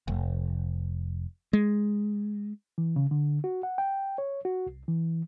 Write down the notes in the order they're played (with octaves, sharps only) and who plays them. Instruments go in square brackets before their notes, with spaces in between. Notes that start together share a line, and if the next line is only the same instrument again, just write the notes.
[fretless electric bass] F1
G#3
[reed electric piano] E3
C#3
D3
F#4
F#5
G5
C#5
F#4
C2
E3